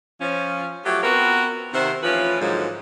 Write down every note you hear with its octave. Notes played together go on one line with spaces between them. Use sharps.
F3 C#4
F3 F#3 A3 F#4 G4
B3 C4 F4 F#4 A#4 B4
C3 D#3 C4 C5 E5 F#5
E3 F3 A3 C#4 F4 B4
G#2 D3 D#3 F3 F#3 G#3